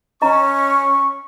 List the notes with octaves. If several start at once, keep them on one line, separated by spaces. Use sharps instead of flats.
C#4 D#5 A#5 C#6